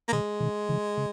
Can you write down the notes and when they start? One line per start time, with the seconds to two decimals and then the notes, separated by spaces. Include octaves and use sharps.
0.08 A#3
0.12 B2 D#3 G#3
0.40 B2 D#3
0.69 C#3 E3
0.97 C#3